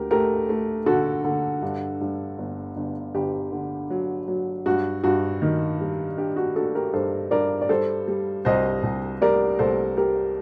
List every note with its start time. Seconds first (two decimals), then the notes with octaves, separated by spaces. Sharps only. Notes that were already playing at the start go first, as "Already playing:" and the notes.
Already playing: D2 G4 A#4
0.11 A3 G4 A#4
0.49 A3
0.86 D3 F#4 A4
1.24 D3
1.62 G2
2.01 G2
2.38 G1
2.77 G1
3.15 G1 G4
3.52 D3
3.90 F#3
4.28 F#3
4.66 G2 F#4
5.04 G2 F#4
5.42 D#3
5.80 G3
6.18 D4 G4
6.36 F#4
6.55 D4 F#4 A4
6.75 G4 A#4
6.93 G2 A4 C5
7.31 G2 A#4 D5
7.61 D5
7.69 G3 A4 C5
8.08 G3
8.45 C2 C5 D#5
8.83 C2
9.22 G3 A#4 D5
9.59 C2 A4 C5
9.97 G3 G4 A#4